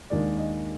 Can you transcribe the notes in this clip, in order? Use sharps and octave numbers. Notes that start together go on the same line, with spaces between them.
D#2 D#3 G#3 D4 D5
D#5